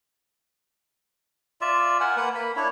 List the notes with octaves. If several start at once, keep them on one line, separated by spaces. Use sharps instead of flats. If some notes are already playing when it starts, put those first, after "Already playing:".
F4 D5 E5 E6
A#4 F#5 G#5
A#3 B4 F#5
A#3 B5
D4 E4 C#5